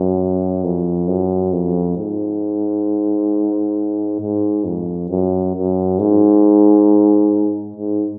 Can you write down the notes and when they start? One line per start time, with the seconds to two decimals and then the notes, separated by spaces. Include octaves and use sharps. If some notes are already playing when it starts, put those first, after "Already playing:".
Already playing: F#2
0.64 F2
1.08 F#2
1.53 F2
1.98 G#2
4.21 G#2
4.65 F2
5.10 F#2
5.55 F#2
5.99 G#2
7.77 G#2